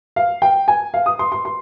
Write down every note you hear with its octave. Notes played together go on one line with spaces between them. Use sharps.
F5
G5
G#5
F5
D#6
C6
C6
C6